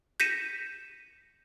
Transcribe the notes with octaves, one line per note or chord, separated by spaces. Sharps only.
G6 A#6 B6 C#7 D#7 E7